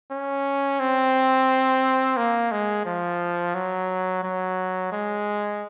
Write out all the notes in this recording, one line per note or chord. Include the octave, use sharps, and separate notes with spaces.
C#4
C4
A#3
G#3
F3
F#3
F#3
G#3